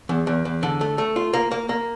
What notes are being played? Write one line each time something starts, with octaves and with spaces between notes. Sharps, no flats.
E2
E2
E2
D3
A3
A3
F4
A#3
A#3
A#3